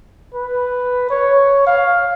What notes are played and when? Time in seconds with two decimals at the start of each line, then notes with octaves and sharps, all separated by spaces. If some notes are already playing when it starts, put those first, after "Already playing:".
0.34 B4
1.10 C#5
1.67 F5